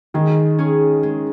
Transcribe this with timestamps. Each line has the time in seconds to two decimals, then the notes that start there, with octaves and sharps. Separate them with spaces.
0.14 D#3 G#3
0.59 C#4 G#4
1.03 G#3